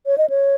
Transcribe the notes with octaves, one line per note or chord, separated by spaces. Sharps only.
C#5
D#5
C#5